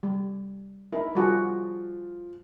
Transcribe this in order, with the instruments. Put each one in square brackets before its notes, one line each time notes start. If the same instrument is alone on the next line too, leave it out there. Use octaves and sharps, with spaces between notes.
[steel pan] G3
[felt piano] D#4 A#4 [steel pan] E4
[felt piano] F3 F4 [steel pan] G3 F#4 G#4